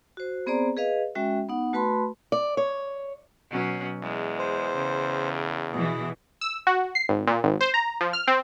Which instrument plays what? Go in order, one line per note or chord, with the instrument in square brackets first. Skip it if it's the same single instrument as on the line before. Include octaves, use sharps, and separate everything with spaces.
[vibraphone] F#4 C5
B3 C4 G#4 C5 D5 A#5
G#4 B4 D#5 F5
G#3 C#4 F#4 E5 G5
B3 D#4 F#5
A3 F#4 B4 A5 B5 C6
[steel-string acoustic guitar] D5
C#5
[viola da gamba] B2 F#3 C#4
[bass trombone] E2 [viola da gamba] G#3
[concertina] C5
[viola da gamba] C#3
[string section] B2 E3 [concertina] G#4
[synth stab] E6
F#4
C7
G#1
A#2
G#1
C5
A#5
F3
F6
C4